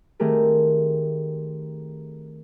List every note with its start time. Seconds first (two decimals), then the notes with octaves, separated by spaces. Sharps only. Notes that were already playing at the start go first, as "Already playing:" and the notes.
0.20 D#3 A3 C4 G4 G#4 A#4